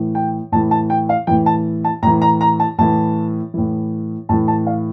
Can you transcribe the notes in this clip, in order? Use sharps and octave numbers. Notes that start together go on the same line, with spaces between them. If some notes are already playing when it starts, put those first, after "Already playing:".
Already playing: A2 E3
G5
A2 E3 A5
A5
G5
F5
A2 E3 G5
A5
A5
A2 E3 A#5
A#5
A#5
A5
A2 E3 A5
A2 E3
A2 E3 A5
A5
F5